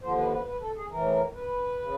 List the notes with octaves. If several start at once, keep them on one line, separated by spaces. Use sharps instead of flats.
D#2 D3 F3 C5
B4
B4
B4
A4
G#4
A2 E3 A#4
B4
C#3